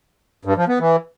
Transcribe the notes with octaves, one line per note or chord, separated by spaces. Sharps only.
G2
F3
B3
E3